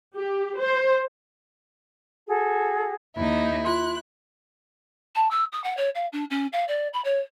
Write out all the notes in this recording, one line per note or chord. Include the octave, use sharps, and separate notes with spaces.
G4
C5
F#4 G#4 A4
D#2 D#4 E4
F4 C6 F#6
A5
E6
D#6
F#5
C#5
F5
D4
C#4
F5
D5
B5
C#5